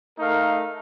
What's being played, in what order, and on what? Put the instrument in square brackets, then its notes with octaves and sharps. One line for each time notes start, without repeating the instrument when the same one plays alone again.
[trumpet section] A3 D#4 A#4 F5